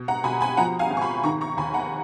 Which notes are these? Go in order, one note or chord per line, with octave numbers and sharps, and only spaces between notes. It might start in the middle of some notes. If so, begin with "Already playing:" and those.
Already playing: B2
F#5 A#5
B2 G#5 B5
G#5 B5
F3 F#5 A#5
F5 G#5
G#1
C#6
G#5 B5
D#3 A#5 C#6
A#5 C#6
D#2 G#5 B5
F#5 A#5